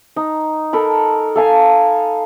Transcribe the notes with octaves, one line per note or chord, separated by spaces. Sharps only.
D#4
A4 A#4 B5
A4 F5 G#5